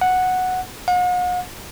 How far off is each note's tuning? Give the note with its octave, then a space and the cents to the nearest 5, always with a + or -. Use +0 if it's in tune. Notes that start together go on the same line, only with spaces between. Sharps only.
F#5 -5
F#5 -45